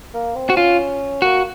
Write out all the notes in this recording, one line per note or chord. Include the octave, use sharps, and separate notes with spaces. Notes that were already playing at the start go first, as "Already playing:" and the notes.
A#3
C4
F#4
C#4 F4
A#3 F#4